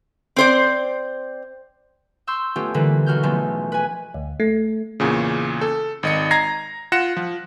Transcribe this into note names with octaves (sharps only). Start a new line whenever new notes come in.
C4 C5 D5
C6 C#6 E6 G6
A3 B3 C#4 F4 G4
D3 E3 G3 A#3 F4 B4
B1 F#4 F6 G6
F3 G#3 A3 B3 C#4
B4 G#5
D2
A3
E2 A#2 C#3
A4
G#1 D#5 C#7
A#5 G#6 A#6 C7
F4 F#5 F#6 A#6 C#7 E7
F3